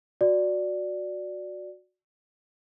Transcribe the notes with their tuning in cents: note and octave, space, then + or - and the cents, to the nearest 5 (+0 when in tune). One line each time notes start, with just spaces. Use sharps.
F#4 -15 D5 +0